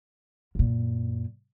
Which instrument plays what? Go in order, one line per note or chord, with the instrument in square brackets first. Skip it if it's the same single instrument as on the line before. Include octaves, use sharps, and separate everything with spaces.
[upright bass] F#2 A#2